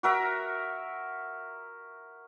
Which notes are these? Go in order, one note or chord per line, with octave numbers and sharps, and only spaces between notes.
F#4 A#4 E5